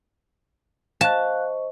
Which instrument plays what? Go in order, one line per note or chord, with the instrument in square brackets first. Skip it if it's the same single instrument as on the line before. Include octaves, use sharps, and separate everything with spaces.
[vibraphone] C5 D#5 C#6 [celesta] F5 F#6 [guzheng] A5